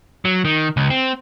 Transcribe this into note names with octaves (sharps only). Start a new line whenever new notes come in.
F#3
D#3
C#2
C4